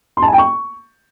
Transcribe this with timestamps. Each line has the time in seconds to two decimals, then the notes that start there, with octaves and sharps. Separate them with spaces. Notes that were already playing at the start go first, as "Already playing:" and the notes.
0.17 C6
0.22 A5
0.28 G#5
0.33 G5
0.38 C#6